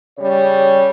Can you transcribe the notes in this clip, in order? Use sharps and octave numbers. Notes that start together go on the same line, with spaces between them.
C#3 G3 C#5